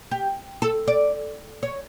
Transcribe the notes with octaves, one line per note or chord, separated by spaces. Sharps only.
G4
A4
D5
C#5